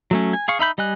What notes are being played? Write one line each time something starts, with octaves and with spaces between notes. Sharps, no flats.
F#3 A3 C#4
G#5
G#4 F5 C#6
D#4 E5 B5 G6
G3 D#5 G#5 F#6